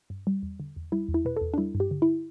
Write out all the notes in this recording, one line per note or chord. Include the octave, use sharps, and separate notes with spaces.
G2
G3
E2
D3
E2
G3 E4
E2
E4
B2 B4
E2 A4
D4
G3 E4
G2
G4
D3
E4